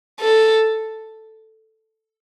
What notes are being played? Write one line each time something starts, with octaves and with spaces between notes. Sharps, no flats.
A4